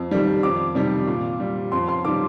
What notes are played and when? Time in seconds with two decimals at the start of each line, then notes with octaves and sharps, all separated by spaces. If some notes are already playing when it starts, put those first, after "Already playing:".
Already playing: F2
0.11 D#3 G3
0.43 F2 D6
0.75 C3 D#3 G3
1.07 A#2
1.40 G3
1.72 F2 C6
1.88 C6
2.05 D#3 G3 D6